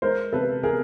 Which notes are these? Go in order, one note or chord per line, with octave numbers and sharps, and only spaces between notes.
G#3 A#4 C5
C3 A4 B4
B3 G#4 A#4